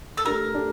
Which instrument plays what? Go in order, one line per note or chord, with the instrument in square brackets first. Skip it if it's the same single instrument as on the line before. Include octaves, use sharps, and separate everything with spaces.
[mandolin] A4
[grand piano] A3 D4 G4 [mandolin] A#4
[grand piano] A3 D4 G4